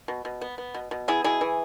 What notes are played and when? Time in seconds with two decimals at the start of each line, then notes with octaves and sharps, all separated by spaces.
0.08 B2
0.25 B2
0.41 B3
0.58 B3
0.74 B2
0.91 B2
1.08 B3 E4 G#4
1.24 B2 E4 G#4
1.41 E3